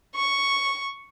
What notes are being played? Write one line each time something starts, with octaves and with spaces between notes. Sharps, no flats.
C#6